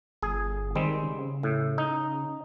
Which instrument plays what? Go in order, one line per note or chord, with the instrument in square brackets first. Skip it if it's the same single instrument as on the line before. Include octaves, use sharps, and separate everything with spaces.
[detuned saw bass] G1 [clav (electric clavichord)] G#4
[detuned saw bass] D#3 [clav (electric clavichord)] G3 G#3 C4
[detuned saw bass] C#3
[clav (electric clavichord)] A2
D#4